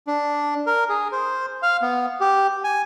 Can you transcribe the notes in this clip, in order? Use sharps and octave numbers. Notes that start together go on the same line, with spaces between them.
D4
A#4
G#4
C5
F5
B3
G4
G#5